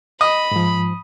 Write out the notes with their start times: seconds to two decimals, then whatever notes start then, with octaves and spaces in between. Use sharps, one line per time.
0.21 D#5 B5
0.51 G#2 F3